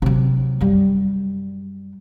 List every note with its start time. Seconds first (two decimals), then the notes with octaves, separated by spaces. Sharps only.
0.02 C3 F#3
0.61 F#2 G3